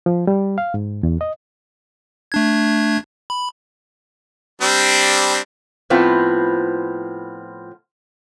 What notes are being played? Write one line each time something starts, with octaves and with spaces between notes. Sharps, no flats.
F3
G3
F5
G#2
E2
D#5
A3 D4 G#6
B5
G3 C4 D4
A2 F3 B3 C4 F4